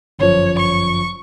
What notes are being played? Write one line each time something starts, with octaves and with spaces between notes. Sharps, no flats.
G1 F#2 F3 C#5
C#6